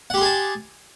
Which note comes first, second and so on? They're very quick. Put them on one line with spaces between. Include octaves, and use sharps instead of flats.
F#5 G4 C6 G#4 A5